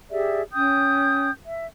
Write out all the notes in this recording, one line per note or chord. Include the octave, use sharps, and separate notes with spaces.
G4 G#4 D5 E5
C#4 G5 D#6 G6
E5